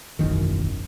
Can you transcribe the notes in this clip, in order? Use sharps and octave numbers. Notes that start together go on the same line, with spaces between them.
E1 A1 F#2 D#3